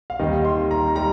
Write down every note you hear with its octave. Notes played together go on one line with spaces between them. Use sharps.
F5
D#2 D#3 G3 D#5
C6
A#5
G3 A#5